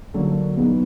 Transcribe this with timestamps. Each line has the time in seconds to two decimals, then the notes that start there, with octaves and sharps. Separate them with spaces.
0.14 D#2 D3 F#3 A#3 D4
0.57 E2 B2 F#3 B3 D#4